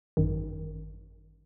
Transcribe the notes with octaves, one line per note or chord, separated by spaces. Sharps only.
G#1 F#2 D#3